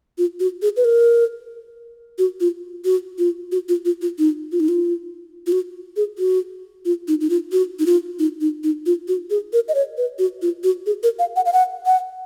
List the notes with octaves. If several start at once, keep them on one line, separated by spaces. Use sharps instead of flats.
F4
F#4
G#4
B4
A#4
F#4
F4
F#4
F4
F#4
F4
F4
F4
D#4
F4
D#4
F4
F4
F#4
G#4
F#4
F4
D#4
D#4
F4
F#4
D#4
F4
D#4
D#4
D#4
F4
F#4
G#4
A#4
D#5
C#5
B4
F#4
F4
F#4
G#4
A#4
F5
F#5
F5
F#5
F#5